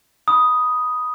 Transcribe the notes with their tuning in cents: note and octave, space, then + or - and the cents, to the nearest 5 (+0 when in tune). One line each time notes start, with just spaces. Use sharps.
B5 +0 D#6 +0